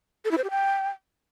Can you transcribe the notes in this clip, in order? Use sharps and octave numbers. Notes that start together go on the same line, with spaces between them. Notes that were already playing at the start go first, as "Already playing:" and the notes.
A4
E4
C5
G4
G5